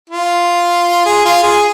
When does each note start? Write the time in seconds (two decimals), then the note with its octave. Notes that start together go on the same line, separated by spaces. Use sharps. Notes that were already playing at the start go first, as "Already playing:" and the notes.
0.10 F4
1.06 G#4
1.25 F4
1.43 G#4